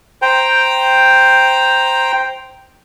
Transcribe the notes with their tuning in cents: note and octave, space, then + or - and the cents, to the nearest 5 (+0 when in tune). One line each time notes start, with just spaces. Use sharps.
C5 +0 G5 +0 A#5 +0